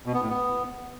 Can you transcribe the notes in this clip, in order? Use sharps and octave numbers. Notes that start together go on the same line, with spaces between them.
B2
B3
A2
B3